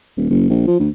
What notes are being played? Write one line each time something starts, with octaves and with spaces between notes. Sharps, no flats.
D#1
F#1
A#1
F3
D2